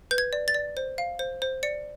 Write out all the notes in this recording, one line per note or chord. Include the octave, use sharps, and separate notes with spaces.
B4 G6
G#6
D5
A6
D5
C5
F5
C5
C5
D5 C#7